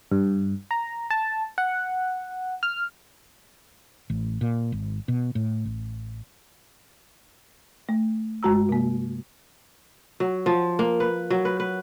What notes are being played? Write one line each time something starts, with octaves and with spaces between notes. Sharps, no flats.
G2
A#5
A5
F#5
F6
A1
A#2
G#1
B2
A2
A1
A3
G2 G#3 F#4 A#5 E6
C3 A#3
F#3
F3
A#3
B4
F#3
B4
B4